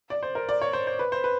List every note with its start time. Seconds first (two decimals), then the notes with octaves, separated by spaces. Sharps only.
0.10 D5
0.23 C5
0.35 A#4
0.49 D5
0.61 C#5
0.73 C5
0.87 C5
0.99 B4
1.12 C5
1.24 B4